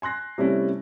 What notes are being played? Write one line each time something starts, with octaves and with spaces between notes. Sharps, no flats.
G#5 C6 F#6 A#6
C3 G3 A3 C#4 E4